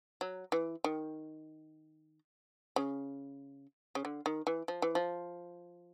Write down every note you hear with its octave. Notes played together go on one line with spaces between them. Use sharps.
F#3
E3
D#3
C#3
C#3
D3
D#3
E3
F3
E3
F3